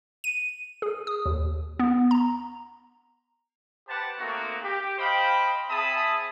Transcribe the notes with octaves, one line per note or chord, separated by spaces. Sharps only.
D#7
G#4
D#6
D#2
B3
A#5
G4 B4 C5 F#5 A5
A3 A#3 C4 D#4 F#4
G4
C5 D#5 F5 G5 B5
C4 G#4 E5 A5 B5 D#6